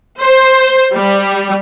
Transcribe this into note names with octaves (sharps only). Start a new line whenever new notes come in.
C5
G3